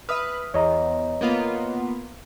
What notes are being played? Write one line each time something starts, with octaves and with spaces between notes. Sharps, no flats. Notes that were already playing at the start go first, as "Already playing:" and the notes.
B4 E5 D#6 F6
E2 C#5 D#5 A#5
A#3 B3 F4